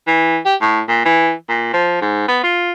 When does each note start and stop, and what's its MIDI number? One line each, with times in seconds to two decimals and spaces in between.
0.07 0.38 52
0.46 0.55 67
0.61 0.80 45
0.88 1.02 46
1.05 1.32 52
1.49 1.72 46
1.73 1.98 53
2.02 2.23 44
2.28 2.39 59
2.43 2.72 65